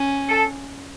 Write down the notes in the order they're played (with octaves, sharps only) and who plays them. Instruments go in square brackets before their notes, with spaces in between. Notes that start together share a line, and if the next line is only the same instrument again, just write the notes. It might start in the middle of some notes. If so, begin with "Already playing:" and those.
Already playing: [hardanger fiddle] C#4
[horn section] A4